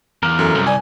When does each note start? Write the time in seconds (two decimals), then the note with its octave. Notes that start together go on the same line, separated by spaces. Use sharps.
0.23 E2 A#4 F5
0.39 F#2 A4
0.55 C2
0.67 D5 G#5